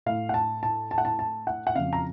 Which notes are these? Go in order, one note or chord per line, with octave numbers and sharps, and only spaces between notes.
A2 F5
F#5
A5
A5
A5
F#5
A5
A5
F#5
F#5
F2 C#3 F5
A#5